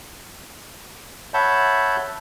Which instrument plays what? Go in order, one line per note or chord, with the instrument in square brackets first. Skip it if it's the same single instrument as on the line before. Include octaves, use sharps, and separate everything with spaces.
[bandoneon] C#5 E5 F#5 A5 B5 G6